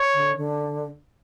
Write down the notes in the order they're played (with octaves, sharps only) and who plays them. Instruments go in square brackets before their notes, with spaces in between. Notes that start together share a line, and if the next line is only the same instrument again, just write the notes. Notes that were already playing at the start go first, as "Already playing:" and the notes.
Already playing: [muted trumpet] C#5
[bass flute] D3
D3